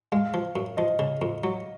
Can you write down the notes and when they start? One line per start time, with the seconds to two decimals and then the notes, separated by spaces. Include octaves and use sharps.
0.12 G#3 F5
0.34 F3
0.56 F#2
0.77 F3 D#5
0.99 C#3
1.22 F2
1.44 F#3